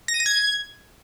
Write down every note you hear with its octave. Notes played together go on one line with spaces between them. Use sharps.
A#6
D#7
A#6
G#6